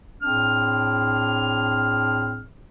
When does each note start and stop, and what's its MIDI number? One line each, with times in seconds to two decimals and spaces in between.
0.22 2.42 45
0.22 2.42 60
0.22 2.42 62
0.22 2.42 68
0.22 2.42 89